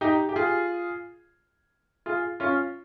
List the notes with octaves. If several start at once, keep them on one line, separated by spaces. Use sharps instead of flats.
D#4 G4
G4
F4 G#4
F4 G#4
C#4 F4